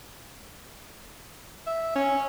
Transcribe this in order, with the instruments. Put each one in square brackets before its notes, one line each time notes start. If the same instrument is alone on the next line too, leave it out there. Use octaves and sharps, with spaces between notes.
[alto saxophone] E5
C#4